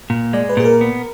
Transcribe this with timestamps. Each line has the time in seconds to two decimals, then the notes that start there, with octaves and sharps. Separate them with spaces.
0.10 A#2
0.33 G#3 D5
0.49 B4
0.57 A#2 G#4
0.65 A#4
0.81 B3